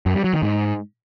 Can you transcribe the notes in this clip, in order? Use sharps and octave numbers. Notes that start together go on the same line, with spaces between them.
F#2
G3
F#3
D#3
G#2